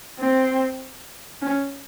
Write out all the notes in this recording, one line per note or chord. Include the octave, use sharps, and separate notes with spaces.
C4
C#4